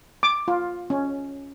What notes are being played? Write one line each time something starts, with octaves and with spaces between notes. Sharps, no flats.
D6
F4
C#4